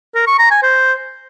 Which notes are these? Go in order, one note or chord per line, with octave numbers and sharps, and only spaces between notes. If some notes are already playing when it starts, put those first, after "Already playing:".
A#4
C#6
A#5
G#5
C5